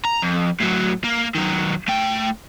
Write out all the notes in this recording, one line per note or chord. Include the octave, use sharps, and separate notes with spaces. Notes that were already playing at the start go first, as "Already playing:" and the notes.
A#5
F2
A2 F#3
A#3
D#3 F#3
A3 G5